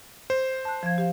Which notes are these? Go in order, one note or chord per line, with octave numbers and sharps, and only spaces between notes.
C5
A5 F#6
F3 F5 G#6
G4 F5